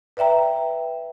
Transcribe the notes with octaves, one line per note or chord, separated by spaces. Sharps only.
B4 D5 E5 G5 A#5